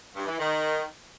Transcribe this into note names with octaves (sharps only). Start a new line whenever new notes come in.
G2
E3
D#3